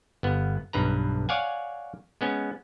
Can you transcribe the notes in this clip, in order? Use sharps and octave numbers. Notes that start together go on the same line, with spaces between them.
G1 B3
B1 G2 B4 A#5
C#5 D5 F5 F#5 G#5
G#3 B3 C#4